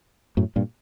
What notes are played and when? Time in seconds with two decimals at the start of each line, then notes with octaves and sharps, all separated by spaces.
0.37 F#2 A2
0.56 G2 A#2